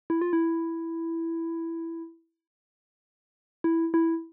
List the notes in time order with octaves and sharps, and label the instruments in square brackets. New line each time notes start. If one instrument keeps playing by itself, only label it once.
[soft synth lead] E4
F4
E4
E4
E4